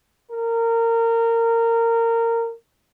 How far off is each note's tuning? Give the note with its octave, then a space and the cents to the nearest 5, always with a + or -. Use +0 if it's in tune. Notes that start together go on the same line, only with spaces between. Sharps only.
A#4 -20